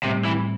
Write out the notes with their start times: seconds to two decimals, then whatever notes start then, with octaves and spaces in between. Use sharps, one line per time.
0.03 A2 C3 G3 C4
0.25 E3